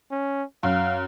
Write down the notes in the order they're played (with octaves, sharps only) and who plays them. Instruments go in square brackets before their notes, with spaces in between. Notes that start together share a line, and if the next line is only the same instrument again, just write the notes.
[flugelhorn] C#4
[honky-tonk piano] F#2 [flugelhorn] F5